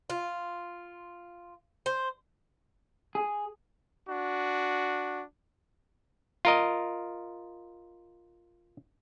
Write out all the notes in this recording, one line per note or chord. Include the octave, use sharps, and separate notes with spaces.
F4
C5
G#4
D4 F#4
F4 A#4 D#5